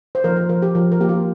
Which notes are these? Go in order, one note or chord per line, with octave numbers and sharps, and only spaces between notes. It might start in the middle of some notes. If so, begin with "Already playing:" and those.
C5
F3 A#4
C5
F3 A#4
G4
F3 A#4
A#4
A#3 G4
F4